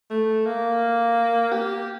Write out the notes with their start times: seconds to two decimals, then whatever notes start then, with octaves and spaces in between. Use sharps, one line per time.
0.10 A3
0.46 A#3
1.52 G4